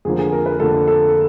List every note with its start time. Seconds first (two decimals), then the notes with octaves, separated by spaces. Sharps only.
0.05 F2 D3 F3 A#3 G#4
0.18 G#4
0.32 A#4
0.46 B4
0.60 F2 D3 F3 A#3 A4
0.88 A4